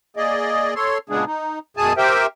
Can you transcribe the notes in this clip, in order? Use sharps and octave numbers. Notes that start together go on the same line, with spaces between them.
A#3 G#4 D5 D#5
A4 C#5 C6
A#2 C#3 G#3 B3 D4 G#4
D#4
F#2 B2 G#3 G#4 G#5 A5
G4 A#4 C5 E5 G5